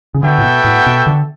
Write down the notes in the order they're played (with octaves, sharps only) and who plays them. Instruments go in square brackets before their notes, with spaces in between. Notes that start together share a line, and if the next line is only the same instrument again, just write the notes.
[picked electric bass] C#3
[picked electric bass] D3 [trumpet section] B3 F#4 A4 E5 G5
[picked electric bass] A2
B2
A2
B2
D3